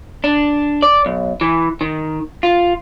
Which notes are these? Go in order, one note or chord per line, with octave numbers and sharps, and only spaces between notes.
D4
D5
B1
E3
D#3
F4